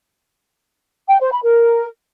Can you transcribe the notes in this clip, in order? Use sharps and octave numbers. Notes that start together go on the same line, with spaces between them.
G5
C5
B5
A#4